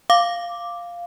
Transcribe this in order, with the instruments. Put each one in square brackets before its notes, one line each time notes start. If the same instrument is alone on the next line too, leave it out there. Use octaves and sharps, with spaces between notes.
[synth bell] F5 D6